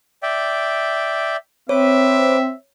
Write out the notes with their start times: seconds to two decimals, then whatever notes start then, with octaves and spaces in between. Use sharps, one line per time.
0.23 D5 E5 G5
1.69 C4 B4 C#5 E5 D6